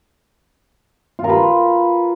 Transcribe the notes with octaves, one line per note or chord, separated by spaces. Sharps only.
F4
A#4
B4